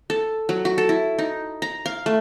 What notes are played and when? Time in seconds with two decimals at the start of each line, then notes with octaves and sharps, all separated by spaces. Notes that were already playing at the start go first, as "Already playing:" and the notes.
0.10 A4
0.49 F#3
0.65 F#4
0.78 A4
0.89 E4
1.18 D#4
1.62 A#5
1.86 F5
2.06 A3